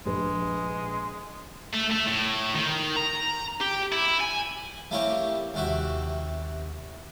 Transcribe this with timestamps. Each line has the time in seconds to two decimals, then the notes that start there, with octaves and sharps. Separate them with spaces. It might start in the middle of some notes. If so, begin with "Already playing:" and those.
0.05 A#1 G#3 B4
1.73 A3
1.91 A3
2.07 A2
2.55 D#3
2.97 A#5
3.61 G4
3.92 E4
4.20 G#5
4.91 A3 A#3 C4 E4 G4 C#5
5.54 D#2 C3 C4 F#4 E5